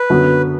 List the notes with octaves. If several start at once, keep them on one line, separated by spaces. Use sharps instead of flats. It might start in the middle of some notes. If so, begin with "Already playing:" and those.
Already playing: B4
F#2 D3 F#3 B3